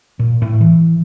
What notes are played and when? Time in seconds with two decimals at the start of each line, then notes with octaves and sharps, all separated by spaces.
0.19 A#2
0.42 A2
0.61 E3